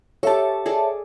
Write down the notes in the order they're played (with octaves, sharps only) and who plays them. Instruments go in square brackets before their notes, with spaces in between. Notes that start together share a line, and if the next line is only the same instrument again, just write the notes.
[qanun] G4 A4 [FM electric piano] C#5 E5 A5
[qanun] G#4 A4 D5